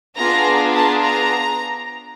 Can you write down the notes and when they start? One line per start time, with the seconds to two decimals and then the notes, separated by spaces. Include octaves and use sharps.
0.16 B3 D4 F4 G#4 A#5
0.74 A5
1.02 A#5